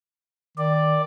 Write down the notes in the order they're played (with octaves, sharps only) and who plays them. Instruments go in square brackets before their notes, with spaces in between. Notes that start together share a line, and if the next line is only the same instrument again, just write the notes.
[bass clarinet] D#3 [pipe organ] D5